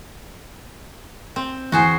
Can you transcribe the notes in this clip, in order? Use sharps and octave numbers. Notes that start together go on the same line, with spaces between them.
C4
E2 F#4 G#4 C5